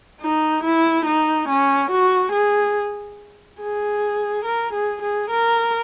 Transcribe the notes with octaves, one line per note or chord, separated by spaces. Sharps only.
D#4
E4
D#4
C#4
F#4
G#4
G#4
A#4
G#4
G#4
A#4